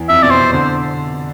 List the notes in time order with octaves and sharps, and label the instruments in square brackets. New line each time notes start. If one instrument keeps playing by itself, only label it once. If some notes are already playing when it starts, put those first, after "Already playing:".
Already playing: [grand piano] E2
[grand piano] F2 [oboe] E5
[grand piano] B2 [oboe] D5
[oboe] C5
[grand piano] C3
[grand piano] D3 [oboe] C5